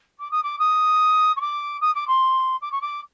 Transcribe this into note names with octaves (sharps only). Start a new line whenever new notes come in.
D6
D#6
D6
D#6
C#6
D6
D#6
D6
C6
D6
C#6
D6